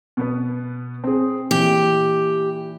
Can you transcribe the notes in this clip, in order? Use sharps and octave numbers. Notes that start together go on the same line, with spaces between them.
B2 B3 B4
C4 G#4
A#2 E3 G4